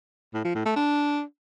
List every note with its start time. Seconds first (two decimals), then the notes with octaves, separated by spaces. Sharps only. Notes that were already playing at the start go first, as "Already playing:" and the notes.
0.34 A2
0.44 F3
0.55 A2
0.65 A3
0.76 D4